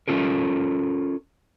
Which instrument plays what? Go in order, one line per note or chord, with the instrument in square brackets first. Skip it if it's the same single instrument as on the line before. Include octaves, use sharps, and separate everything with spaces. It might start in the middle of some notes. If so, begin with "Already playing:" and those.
[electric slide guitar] C#4 F4 A4 A#4